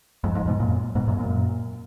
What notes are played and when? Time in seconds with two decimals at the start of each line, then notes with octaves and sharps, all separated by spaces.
0.24 F2 G#2
0.35 F2 G#2
0.48 G#2 B2
0.60 F#2 A#2
0.95 G#2 B2
1.08 F#2 A#2
1.19 F#2 A#2